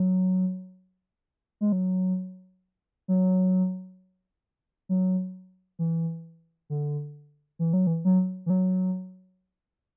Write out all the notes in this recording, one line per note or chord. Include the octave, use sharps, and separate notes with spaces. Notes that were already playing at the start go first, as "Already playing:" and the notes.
Already playing: F#3
G#3
F#3
F#3
F#3
E3
D3
E3
F#3
E3
F#3
E3
F#3